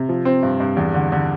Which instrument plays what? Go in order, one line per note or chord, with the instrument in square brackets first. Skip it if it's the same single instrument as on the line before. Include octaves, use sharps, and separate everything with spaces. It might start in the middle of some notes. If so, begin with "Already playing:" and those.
Already playing: [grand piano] C3
F3
C4
G2
G2
E2
D3
D3